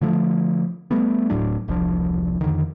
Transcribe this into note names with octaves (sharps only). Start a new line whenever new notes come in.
D3 F3 A3
G3 A3 B3
D1 A2 F#3 D4
E1 C2 F3 D4
F2 G#2 D3 D#3